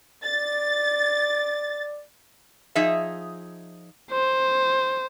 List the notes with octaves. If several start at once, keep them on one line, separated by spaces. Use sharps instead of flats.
D5 A6
F3 D#4 G#4 E5
C5